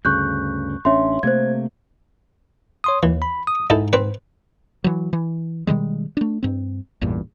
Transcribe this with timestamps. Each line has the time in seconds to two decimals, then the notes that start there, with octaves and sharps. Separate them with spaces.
0.05 D2 G2 C#3 C#6 F#6 G6
0.85 A1 C#4 D4 C#5 E5 C6
1.23 C3 A3 A#3 C5 G#6
2.84 C#5 C6 D#6
3.03 D#2 E3
3.22 B5
3.47 D#6
3.70 G#2 D#4 E4 A4
3.93 C4 B4
4.84 E3 F#3
5.13 E3
5.67 B2 D#3 G3 G#3
6.17 A3 D4
6.43 G2 C4
7.01 A1 E2 G2 A#2